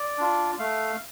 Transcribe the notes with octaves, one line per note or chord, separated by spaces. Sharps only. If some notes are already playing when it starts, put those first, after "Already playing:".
Already playing: D5
D4 F4
A3 F5